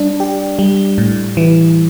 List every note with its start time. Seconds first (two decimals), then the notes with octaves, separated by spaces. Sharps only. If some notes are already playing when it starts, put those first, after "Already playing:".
Already playing: G3 D4
0.20 G4
0.59 G3
0.98 A2
1.37 E3